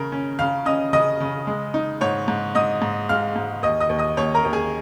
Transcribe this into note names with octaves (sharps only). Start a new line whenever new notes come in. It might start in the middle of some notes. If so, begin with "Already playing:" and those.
Already playing: C#3 A#4
C#4
C#3 F5 F6
C#4 D#5 D#6
C#3 D#5 D#6
C#3
G#3
D#4
G#2 C#5 C#6
G#2
G#2 D#5 D#6
G#2
G#3 F5 F6
G#2
D#2 D#5 D#6
D#5 D#6
D#2
D#5 D#6
D#2 C#5 C#6
A#4 A#5
D#2
G#4 G#5